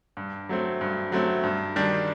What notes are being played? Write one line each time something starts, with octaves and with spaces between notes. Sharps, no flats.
G2
F#3 A3 C4
G2
F#3 A3 C4
G2
D#3 G3 D4